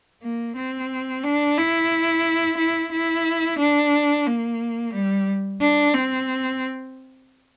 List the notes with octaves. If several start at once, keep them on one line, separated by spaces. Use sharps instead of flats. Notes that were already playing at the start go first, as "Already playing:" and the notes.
A#3
C4
D4
E4
E4
E4
D4
A#3
G3
D4
C4